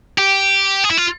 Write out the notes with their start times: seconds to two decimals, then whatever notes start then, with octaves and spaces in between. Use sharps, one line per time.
0.18 G4
0.84 G#4
0.91 E4
0.97 F4